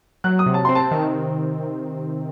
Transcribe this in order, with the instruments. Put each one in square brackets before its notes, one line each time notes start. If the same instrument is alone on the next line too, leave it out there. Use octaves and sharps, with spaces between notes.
[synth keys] F#3 [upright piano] F#6
[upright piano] D#6
[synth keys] C3
[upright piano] A5
[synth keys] C4 [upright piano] C6
[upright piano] A5
[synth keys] D#3